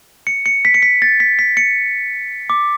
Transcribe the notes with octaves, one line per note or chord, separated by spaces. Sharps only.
C#7
C#7
B6
C#7
B6
A6
B6
B6
C#7
D6